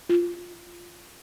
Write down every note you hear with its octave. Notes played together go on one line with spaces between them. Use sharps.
F4